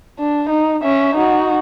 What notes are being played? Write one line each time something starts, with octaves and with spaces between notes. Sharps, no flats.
D4
D#4
C#4 E5
D#4 F#4